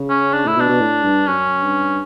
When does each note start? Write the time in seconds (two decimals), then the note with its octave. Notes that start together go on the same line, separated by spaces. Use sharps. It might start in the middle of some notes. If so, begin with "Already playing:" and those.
Already playing: C#3
0.09 C#4
0.33 D4
0.46 A2 E4
0.57 B2
0.60 D4
0.69 B2
0.81 A2
1.03 G2
1.27 F#2 C#4
1.63 G2